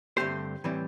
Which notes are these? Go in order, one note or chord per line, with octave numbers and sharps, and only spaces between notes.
G2 D3 A3 C4 G4 C5
A2 E3 G3 C4